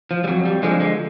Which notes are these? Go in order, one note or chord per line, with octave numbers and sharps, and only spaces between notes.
F3
G3
F2 F#3
G3
D3 F3 G#3
G#3